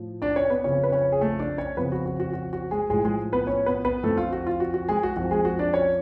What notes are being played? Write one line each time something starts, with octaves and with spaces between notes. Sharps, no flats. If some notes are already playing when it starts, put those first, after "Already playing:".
Already playing: A2 F3
D4 D5
C#4 C#5
B3 B4
F2 C#3 F3 C#4 C#5
B4
C#4 C#5
G#4
A3 A4
D4 D5
C#4 C#5
F2 C#3 F3 B3 B4
F#4
F#4
F#4
F#4
F#4
G#3 G#4
A2 F3 G#3 G#4
G#3 G#4
B3 B4
C#4 C#5
B3 B4
B3 B4
F2 D3 F3 A3 A4
F4
F#4
F4
F#4
F#4
G#3 G#4
F#4
F2 F3 F#4
G#3 G#4
F#4
D4 D5
C#4 C#5